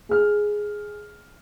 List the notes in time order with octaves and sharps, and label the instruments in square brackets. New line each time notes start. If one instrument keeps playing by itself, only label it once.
[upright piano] G#4 F6